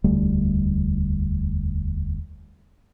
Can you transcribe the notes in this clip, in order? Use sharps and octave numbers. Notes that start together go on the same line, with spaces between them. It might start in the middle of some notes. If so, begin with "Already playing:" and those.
E1 D2 G3 A3